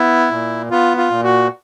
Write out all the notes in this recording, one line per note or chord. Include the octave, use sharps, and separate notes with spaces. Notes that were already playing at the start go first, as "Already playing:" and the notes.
Already playing: B3 E4
A#2
B3 F4
F4
A#2
F#4